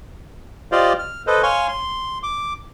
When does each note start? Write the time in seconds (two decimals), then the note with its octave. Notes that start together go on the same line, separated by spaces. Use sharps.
0.72 F4 G4 C5 D5 D#5 F5
0.99 F6
1.27 A4 B4 C5 D#5
1.43 C#5 F5 G#5 C6 C#6
1.68 C6
2.23 D6